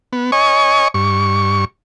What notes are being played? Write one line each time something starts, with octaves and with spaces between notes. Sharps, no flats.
B3
C#5 D#5 G#5 C#6
G2 C#6